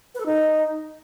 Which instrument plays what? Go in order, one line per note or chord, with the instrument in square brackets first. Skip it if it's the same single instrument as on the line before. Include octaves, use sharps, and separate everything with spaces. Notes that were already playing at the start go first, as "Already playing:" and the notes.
[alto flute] B4
A4
D#4